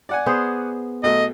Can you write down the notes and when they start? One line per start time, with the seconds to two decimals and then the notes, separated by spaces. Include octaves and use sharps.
0.09 D5 F#5 G#5
0.26 B3 G#4 C5
1.03 B1 A3 D#5